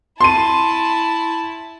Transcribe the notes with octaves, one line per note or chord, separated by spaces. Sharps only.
E4 A5 C6 D#7